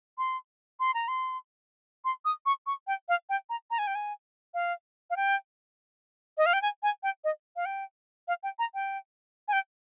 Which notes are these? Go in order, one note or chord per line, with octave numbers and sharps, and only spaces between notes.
C6
C6
A#5
C6
C6
D#6
C#6
C#6
G5
F5
G5
A#5
A#5
G#5
G5
G#5
F5
F5
G5
D#5
F5
G5
G#5
G#5
G5
D#5
F5
G5
F5
G5
A#5
G5
G#5
G5